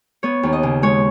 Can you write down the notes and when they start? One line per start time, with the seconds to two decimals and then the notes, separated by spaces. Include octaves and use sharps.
0.23 B3 C#5
0.43 D#2
0.53 D#5
0.63 C#3
0.82 G#3 C#5